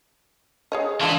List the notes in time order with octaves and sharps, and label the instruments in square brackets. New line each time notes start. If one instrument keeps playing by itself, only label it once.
[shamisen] G#4 C#5 D#5
[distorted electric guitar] E3 [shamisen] G#3 D4 F4